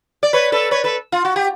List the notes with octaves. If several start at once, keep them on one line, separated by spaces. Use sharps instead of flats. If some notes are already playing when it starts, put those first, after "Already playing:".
D5
B4 C#5
A4 B4
B4 C#5
A4 B4
F4
F#4
G4